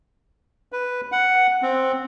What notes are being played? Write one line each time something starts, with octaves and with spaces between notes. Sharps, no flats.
B4
F#5
C4